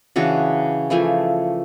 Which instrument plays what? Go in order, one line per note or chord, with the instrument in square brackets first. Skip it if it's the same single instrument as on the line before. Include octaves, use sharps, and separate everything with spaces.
[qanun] C#3 E3 D4 F#4
E3 F3 A3 G#5